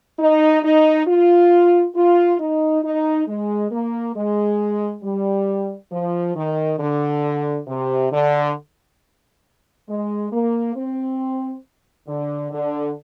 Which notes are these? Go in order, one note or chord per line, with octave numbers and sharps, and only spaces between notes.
D#4
D#4
F4
F4
D#4
D#4
G#3
A#3
G#3
G3
F3
D#3
D3
C3
D3
G#3
A#3
C4
D3
D3